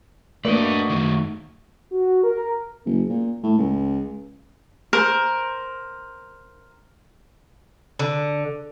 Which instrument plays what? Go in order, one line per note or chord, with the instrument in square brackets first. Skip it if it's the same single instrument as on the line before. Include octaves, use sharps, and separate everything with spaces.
[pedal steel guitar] A3 F#4 D#5 [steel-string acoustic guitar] A#3 D5 [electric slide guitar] D4 B4
[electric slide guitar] F#2 D#3
[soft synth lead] F#4
A#4
[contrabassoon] F#1
A#2
A2
C#2
[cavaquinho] A#4 C5
[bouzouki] D3